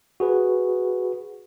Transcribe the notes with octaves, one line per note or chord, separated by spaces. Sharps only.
F#4 G#4 B4